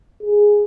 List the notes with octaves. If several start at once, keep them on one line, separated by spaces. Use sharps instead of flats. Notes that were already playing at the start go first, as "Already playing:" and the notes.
G#4